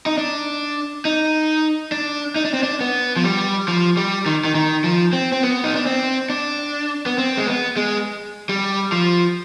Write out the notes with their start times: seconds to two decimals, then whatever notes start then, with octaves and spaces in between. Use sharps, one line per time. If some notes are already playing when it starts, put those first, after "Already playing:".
0.06 D#4
0.18 D4
1.05 D#4
1.92 D4
2.36 D#4
2.45 D4
2.54 C4
2.63 D4
2.81 B3
3.16 F3
3.24 G3
3.68 F3
3.97 G3
4.26 D#3
4.45 D#3
4.55 D#3
4.84 F3
5.13 C4
5.32 C4
5.43 B3
5.64 D#4
5.76 D4
5.86 C4
6.30 D4
7.06 B3
7.18 C4
7.37 G#3
7.47 B3
7.77 G#3
8.49 G3
8.92 F3